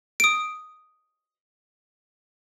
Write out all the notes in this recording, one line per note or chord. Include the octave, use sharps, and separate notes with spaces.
D#6 D7